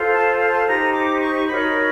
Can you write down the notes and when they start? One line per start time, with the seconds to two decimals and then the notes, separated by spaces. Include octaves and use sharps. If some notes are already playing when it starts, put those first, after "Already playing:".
Already playing: F4 A4 C5
0.14 A5
0.40 A5
0.67 D#4 G4 C5 A#5
0.94 D6
1.21 C#6
1.47 D#4 F#4 A#4 C#5 B5